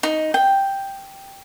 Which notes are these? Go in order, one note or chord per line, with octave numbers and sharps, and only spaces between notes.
D#4
G5